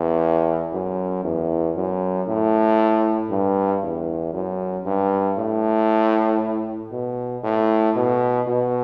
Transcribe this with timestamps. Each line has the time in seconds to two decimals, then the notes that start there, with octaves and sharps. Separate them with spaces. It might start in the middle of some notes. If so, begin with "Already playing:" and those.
Already playing: E2
0.73 F#2
1.24 E2
1.76 F#2
2.28 A2
3.30 G2
3.83 E2
4.33 F#2
4.86 G2
5.38 A2
6.92 B2
7.44 A2
7.96 B2
8.47 B2